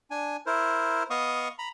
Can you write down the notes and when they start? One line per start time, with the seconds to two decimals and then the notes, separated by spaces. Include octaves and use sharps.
0.11 D4 G#5
0.46 E4 A#4 C5
1.10 B3 D#5 F5 C#6 D#6
1.58 A#5 B5